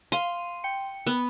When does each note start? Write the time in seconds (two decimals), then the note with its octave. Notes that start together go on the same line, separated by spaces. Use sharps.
0.12 F5 C6 D#7
0.64 G5 C#7
1.07 B3